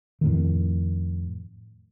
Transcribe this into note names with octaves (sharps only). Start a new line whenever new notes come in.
F2 A2 D#3